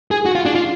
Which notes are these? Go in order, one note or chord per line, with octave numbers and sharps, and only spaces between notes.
G#4
F#4
F4
D4
F4